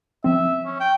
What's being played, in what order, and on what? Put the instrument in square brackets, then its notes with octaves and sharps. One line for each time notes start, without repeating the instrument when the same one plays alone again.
[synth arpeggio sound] F3 C4 [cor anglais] E5
[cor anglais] C#4
G5